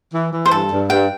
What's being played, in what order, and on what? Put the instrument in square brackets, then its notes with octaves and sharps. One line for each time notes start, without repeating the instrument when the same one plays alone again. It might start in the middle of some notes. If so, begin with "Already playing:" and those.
[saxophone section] E3
E3
[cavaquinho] C5
[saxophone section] G2 [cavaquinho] A4
[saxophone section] G2
[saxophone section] G2 [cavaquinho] G5